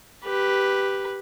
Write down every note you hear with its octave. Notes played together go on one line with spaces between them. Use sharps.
G4 B4